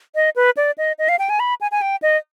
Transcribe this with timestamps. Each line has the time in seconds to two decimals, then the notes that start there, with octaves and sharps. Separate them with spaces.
0.15 D#5
0.36 B4
0.57 D5
0.78 D#5
0.99 D#5
1.09 F5
1.19 G5
1.30 G#5
1.40 B5
1.61 G#5
1.71 G#5
1.82 G5
2.02 D#5